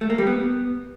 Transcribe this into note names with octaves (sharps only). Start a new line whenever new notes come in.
A3
A#3
G3
B3